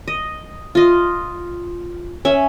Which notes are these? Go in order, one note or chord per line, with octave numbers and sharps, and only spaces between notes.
D#5
F4 D#5
C#4 E5